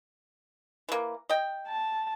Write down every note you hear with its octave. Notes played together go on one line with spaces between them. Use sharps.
E3 A#3
D#5 G5
A5